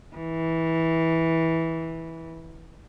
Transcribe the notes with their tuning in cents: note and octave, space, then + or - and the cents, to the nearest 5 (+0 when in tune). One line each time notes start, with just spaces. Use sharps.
E3 -15